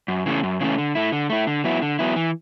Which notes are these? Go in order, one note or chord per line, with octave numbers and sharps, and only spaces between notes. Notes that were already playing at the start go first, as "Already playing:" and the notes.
F#2
C#3 E3 A3 C#4
F#2
C#3 E3 A3 C#4
D3
A3 E4
D3
A3 E4
D3
F#3 B3 E4
D3
F#3 B3 E4
E3